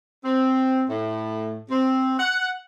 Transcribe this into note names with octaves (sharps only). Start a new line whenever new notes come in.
C4
A2
C4
F#5